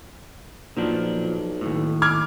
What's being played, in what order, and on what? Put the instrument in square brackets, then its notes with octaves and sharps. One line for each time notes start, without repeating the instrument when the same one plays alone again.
[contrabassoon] B1 [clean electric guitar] A#2 F3 D4
[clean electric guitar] D#2 A2
[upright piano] D6 F6 G#6